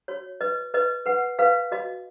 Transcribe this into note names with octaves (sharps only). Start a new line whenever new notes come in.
F#4 C#5
B4 D#5
B4 D#5
B4 F#5
B4 F5
F#4 D#5